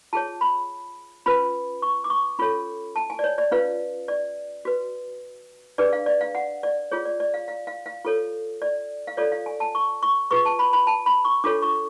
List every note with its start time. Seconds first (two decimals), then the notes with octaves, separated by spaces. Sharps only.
0.13 F4 G#4 C#5 A5
0.41 B5
1.26 C#4 F4 B4 B5
1.82 C#6
2.04 D6
2.10 C#6
2.39 C#4 F4 A4 C#5 B5
2.96 A5
3.10 G#5
3.19 D5
3.24 C#5
3.38 D5
3.51 C#4 F4 B4 F5
4.08 D5
4.65 F#4 B4
5.78 D4 G#4 B4 D5
5.93 F5
6.06 D5
6.21 F5
6.35 F#5
6.63 D5
6.92 F4 G#4 C#5
7.06 D5
7.20 D5
7.34 F5
7.48 F5
7.67 F5
7.86 F5
8.05 F4 A4 C#5
8.62 D5
9.07 F5
9.17 F4 A4 C#5 D5
9.32 F5
9.46 G#5
9.60 A5
9.75 C#6
10.03 C#6
10.31 F4 G#4 B4 C#6
10.45 A5
10.59 B5
10.73 B5
10.87 A5
11.06 B5
11.25 C#6
11.44 D4 F4 A4 C#5 D6
11.62 C#6